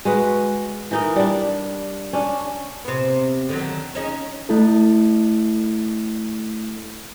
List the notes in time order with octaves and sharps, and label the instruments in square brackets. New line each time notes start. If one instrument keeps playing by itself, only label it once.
[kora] G#3 F#4 B4
E3 D#4 A#4
G3 D4
C#4 D4
[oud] C3 B3
D3 D#3 F#3
C#4 D#4 G#4
[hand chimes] A3 E4 A4